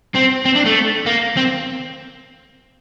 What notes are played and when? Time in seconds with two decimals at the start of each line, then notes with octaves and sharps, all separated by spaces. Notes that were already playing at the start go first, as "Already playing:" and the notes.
0.15 C4
0.45 C4
0.55 D4
0.66 A3
1.06 A#3
1.37 C4